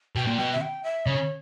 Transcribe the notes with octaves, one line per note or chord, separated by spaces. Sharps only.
B2 G5
A#2
B2 G5
E5
G5
E5
C#3 C#5